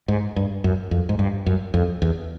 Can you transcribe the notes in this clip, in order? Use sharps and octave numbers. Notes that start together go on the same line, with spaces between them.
G#2
G2
F#2
F2
G#2
G2
F#2
F2
E2